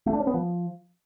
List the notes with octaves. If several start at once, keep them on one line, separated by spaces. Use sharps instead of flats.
A3
D4
C#4
B3
F3